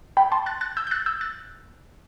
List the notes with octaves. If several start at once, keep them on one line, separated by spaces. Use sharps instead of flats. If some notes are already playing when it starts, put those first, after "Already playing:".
G5 B5
A5 C6
F#6 A6
F#6 A6
E6 G6
G6
F#6 A6
E6 G6
F#6 A6